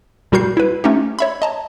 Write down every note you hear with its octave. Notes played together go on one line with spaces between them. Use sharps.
A#2 G3 F#4 A#4 G6 C7
E4 B4
A3 C#4 D#4 G4
C#5 E5 B5
D#5 A5 A#5